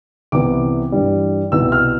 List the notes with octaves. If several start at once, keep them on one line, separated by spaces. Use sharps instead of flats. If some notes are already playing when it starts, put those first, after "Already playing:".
C2 C3 E3 B3 D6
G2 E3 G3
C2 B2 B3 E4 E6
F6